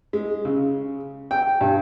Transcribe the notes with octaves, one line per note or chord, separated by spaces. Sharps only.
G#3
C#3
G5
G2